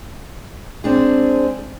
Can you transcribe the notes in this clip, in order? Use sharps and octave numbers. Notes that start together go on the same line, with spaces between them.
G#3 C4 D4 G#4